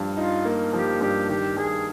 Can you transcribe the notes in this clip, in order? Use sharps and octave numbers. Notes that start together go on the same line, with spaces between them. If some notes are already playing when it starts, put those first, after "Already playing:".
Already playing: G2 F3
D#4 F4
A#3
F3 G4
G2 G4
D#3 G4
G2 G#4